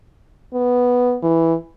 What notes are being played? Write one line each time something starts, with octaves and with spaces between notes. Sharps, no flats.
B3
E3